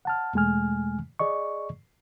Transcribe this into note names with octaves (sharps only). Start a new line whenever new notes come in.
F#5 A5 F6
E2 B2 G#3 A3 G#5 F6
G#4 D5 D#5 C#6